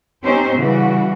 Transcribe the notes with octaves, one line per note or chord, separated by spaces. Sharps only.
C4 C#4 D#4 G4 C5 C#5
C#3 E3 G3 F#4